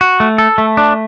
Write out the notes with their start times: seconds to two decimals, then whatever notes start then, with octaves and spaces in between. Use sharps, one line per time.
0.01 F#4
0.20 A3
0.38 A4
0.58 A3
0.77 D4